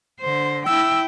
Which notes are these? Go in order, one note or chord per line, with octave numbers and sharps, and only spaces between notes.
D3 C5
E4 G5 E6